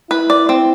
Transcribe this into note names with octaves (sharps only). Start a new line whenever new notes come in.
E4 B4
D5
C4